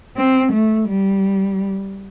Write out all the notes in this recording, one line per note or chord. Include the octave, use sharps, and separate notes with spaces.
C4
A3
G3